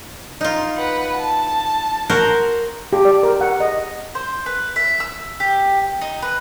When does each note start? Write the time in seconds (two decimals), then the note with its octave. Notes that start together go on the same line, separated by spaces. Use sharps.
0.41 D#4 F4
0.77 B4 F#5
1.18 A5
2.10 F#4 A#4 C5
2.93 G4
3.05 D5
3.23 A#4
3.41 F#5
3.60 D#5
4.15 C5
4.46 B4
4.76 E5
5.00 E6
5.40 G4
6.01 D#4
6.22 B4